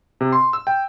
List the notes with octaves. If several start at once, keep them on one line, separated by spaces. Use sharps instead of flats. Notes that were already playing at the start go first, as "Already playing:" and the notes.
C3
C6
E6
G5